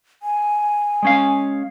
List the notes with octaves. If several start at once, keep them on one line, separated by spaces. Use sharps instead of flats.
G#5
G#3 C#4 F5